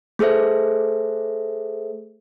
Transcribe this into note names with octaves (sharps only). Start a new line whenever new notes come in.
A3 G#4 A4 C5 E5